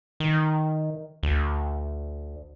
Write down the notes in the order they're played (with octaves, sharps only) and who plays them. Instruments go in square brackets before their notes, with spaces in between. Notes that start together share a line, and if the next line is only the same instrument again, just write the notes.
[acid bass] D#3
D2